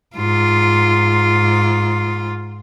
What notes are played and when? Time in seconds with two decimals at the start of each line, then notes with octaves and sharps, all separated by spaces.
0.16 G#2 F4